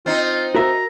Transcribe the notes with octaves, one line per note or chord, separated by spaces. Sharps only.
C4 D#4 F4
F#4 A#4 E5 A#5